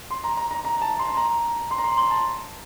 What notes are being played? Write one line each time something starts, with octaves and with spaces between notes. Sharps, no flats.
C6
A#5
A#5
A#5
A#5
A5
C6
A#5
C6
A#5
C6
C6
A5